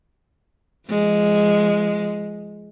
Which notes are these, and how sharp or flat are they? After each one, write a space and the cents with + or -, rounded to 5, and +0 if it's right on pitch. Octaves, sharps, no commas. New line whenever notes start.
F3 -30 G#3 +0